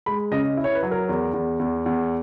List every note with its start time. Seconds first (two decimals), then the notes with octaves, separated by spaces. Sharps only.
0.06 G#3 B5
0.31 C#3 D#5
0.57 E4
0.64 C#5
0.75 B4
0.83 F#3
0.91 A#4
1.09 E2
1.34 E2
1.59 E2
1.86 E2